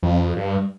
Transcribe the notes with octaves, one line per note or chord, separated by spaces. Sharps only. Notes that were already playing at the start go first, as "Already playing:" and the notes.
F2
G2